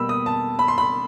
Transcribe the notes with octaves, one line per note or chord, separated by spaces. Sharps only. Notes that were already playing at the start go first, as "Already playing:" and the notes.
Already playing: B2 G3 A#3 B5 E6
D#6
A5
B5
C6
B5